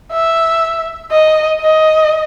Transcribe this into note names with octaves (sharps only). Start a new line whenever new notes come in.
E5
D#5
D#5